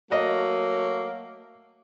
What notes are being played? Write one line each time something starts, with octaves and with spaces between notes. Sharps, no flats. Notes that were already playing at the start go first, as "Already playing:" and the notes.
F#3 A3 A#3 D#5